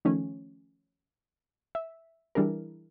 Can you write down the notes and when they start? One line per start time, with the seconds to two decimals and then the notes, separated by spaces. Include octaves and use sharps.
0.05 D#3 F3 A3 C#4
1.75 E5
2.35 E3 G3 D4 E4 G#4 A#4